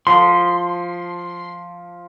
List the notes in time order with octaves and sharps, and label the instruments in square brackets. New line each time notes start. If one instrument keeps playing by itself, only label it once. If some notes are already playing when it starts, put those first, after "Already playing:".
[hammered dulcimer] F3 [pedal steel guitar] C6